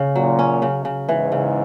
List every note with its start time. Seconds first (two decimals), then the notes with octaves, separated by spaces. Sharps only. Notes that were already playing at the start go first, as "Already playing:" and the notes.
Already playing: C#3 C#4
0.15 F#2 A#2 F#3
0.39 C#4
0.62 C#3
0.85 C#3
1.09 E2 G#2 E3
1.32 C#3